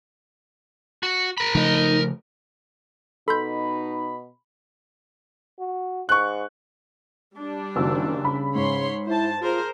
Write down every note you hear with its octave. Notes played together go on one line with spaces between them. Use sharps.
F#4
A#4 B5
C#3 F3 A3 D#4 D#5
B2 D#4 A4 B5 C6 G6
F#4
G#2 C#6 F#6
G3 D4
F#1 D#3 F#4 E6
C#3 B5
G#2 C#5 B5 C6
E4 C5 A5
F4 G#4 A#4 C5